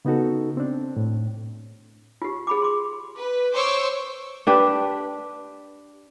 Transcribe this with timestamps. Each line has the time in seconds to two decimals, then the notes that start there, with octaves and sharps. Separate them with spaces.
0.05 C#3 B3 D#4 F#4 A4
0.57 C4 D4
0.97 A2
2.22 F4 G4
2.47 G#4 B5 D6
2.62 C6 D6
3.16 B4
3.53 C5 C#5 C#6 D6 E6
4.47 D4 G4 B4